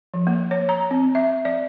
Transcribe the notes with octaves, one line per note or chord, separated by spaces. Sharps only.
F3
A#3
C#5
A#5
C4
E5
D5